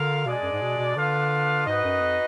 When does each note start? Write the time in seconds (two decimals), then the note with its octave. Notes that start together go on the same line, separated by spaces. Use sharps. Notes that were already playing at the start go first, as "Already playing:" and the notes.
Already playing: D3 F4 A#4 F5
0.25 B2 G#3 D4 G#4 D5
0.43 F#2
0.52 G#2
0.61 B2
0.78 B2
0.96 D3 D4 F4 B4 F5
1.66 G#2 D#4 F#4 B4 D#5
1.84 F#2
2.01 F2